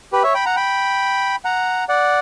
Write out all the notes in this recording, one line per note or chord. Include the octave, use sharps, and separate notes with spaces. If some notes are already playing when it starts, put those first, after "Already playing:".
G4 B4
C#5 E5
G5 B5
F#5 A#5
G5 B5
F#5 A#5
D5 F#5